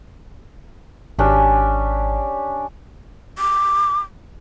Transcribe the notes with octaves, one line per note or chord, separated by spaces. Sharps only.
G#1 C#4 D4 G4
D6